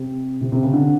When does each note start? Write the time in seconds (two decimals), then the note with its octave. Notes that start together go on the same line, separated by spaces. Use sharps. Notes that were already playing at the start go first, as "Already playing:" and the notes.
Already playing: C3
0.41 C3
0.52 C3
0.63 C#3
0.73 D3